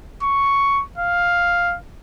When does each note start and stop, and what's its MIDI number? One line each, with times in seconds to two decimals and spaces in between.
0.23 0.83 85
0.98 1.76 77